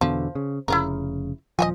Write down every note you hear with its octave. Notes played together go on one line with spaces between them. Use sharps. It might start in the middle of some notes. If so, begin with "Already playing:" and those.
E2 B2 D3 F3
C#3
F1 C#3 E4 F4 A#4
D#1 F3 D#5 G5 G#5